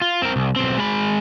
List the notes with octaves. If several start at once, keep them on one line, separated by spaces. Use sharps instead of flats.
F4
C4 A#4
C2
B1 C4
G#3 B5